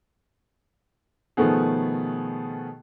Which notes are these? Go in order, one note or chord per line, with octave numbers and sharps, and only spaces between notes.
B2 D#3 F3 A3 B3 G#4